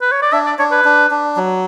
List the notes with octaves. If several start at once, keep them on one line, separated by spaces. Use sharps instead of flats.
B4
C#5
D5
D4 E5
D5
D4 C#5
B4
D4
D4
F#3